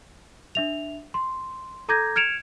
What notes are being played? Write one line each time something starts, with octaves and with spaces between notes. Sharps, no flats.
D4 E5 F7
C6
A4 A#5 D6 G6 G#6 A#6
F6 G#6 C#7 D7 E7 F7